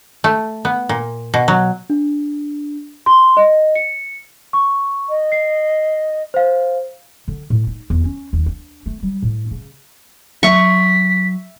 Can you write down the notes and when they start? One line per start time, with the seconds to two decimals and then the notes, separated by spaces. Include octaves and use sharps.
0.24 A3
0.65 B3
0.89 A#2
1.34 B2
1.48 F#3
1.90 D4
3.06 C6
3.37 D#5
3.75 C#7
4.53 C#6
5.09 D#5
5.32 C7
6.34 C5 F5
7.28 D3
7.50 A2
7.67 D#4
7.90 E2
8.04 C#4
8.33 D#2
8.46 D4
8.86 A3
9.03 G3
9.23 A2
9.51 C#3
10.43 F#3 E5 C#6 B6